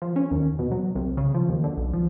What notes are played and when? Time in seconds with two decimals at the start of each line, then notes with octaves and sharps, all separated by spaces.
0.02 F3
0.16 C#4
0.31 D#2
0.59 B2
0.71 F#3
0.95 C2
1.17 C#3
1.34 F3
1.49 D#2
1.64 D3
1.77 B1
1.93 F3